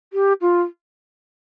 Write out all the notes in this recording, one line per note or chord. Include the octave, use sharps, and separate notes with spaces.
G4
F4